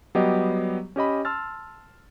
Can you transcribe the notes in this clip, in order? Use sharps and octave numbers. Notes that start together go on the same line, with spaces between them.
F#3 G3 B3 G4 D#5
C#4 G4 D#5 B5
A5 C6 E6 F6 A6